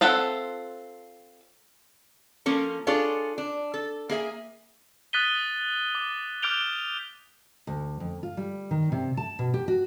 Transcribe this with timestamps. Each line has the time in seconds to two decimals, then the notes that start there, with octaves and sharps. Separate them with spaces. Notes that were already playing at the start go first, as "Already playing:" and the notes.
0.01 C4 F4 A4 E5 F#5
2.46 F3 A#3 C#4 A4
2.87 D4 F4 G#4 A4 C#5
3.38 D4
3.74 A4
4.09 A#3 G#4 E5 G#5
5.13 D#6 F#6 A6 B6 D#7 G7
5.95 D6
6.42 D6 F6 G6 D7 F7 G7
7.67 D2
8.00 F2
8.23 F4
8.37 G3
8.71 D#3
8.92 C3
9.17 A5
9.39 B2
9.54 G4
9.68 F#4